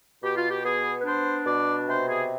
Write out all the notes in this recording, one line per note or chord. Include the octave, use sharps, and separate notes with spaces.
B2 G4
F4
G4
B3 G#4
B4
D4 C5
B2 D5
C3 C5
G#4